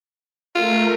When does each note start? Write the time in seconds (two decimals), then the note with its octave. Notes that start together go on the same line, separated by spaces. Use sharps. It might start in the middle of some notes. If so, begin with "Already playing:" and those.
0.55 A3 F4 A#4